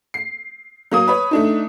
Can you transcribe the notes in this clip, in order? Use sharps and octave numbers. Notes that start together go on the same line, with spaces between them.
C7
F#3 A#3 D#6
B4 C#5
A3 D4 D#4